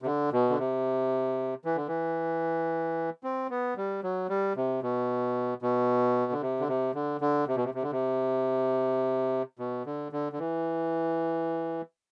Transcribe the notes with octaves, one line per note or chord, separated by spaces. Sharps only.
C3
D3
B2
D3
C3
E3
D3
E3
C4
B3
G3
F#3
G3
C3
B2
B2
D3
C3
D3
C3
D3
D3
C3
B2
C3
C3
D3
C3
B2
D3
D3
D3
E3